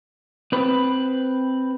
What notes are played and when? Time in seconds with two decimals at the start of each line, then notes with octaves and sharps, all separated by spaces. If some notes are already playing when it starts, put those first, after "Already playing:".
0.52 C4 B4